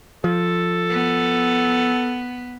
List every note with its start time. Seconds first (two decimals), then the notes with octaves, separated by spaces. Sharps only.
0.24 F3 A4
0.90 B3